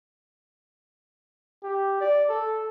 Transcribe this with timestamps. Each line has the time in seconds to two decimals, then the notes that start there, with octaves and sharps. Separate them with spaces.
1.63 G4
2.01 D5
2.29 A4